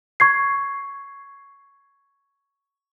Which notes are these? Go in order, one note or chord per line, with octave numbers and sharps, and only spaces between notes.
C#6 G#6 C7